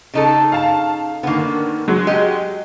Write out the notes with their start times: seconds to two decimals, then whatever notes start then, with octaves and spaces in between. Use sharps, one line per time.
0.14 C#3 D#4 A4
0.52 F5 A5
1.23 D3 D#3 A#3 B3
1.88 F#3 G#3
2.07 G4 D#5